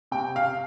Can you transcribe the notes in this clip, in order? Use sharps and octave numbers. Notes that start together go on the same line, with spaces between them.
C3 G5
F5